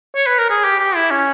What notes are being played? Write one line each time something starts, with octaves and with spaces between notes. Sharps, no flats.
C#5
B4
A#4
G#4
G4
G4
E4
C#4